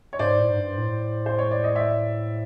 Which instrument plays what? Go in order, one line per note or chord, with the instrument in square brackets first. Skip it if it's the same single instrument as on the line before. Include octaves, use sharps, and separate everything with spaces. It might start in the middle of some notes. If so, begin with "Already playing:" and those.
[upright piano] C#5
[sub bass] G#2 [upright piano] C5 D5
[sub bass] A2
G#2
G2
A2
[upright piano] C5
C#5
D5
D#5
D5 E5